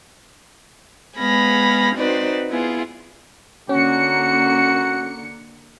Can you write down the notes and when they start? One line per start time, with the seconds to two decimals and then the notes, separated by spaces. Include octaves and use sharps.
1.18 G#3 B3 G#4 F5 B5 A#6
1.96 C4 D#4 F#4 B4 C5 D5
2.49 B3 E4 F4 G#4
3.69 D3 A#3 C#4 F#4 C#7